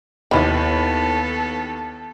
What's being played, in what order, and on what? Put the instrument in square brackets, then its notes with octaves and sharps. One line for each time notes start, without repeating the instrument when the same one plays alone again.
[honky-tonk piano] D#2 B5 [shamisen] D#3 E3 E4 [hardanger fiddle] B3 [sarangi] A4